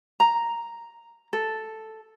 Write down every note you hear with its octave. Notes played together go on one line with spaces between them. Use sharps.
A#5
A4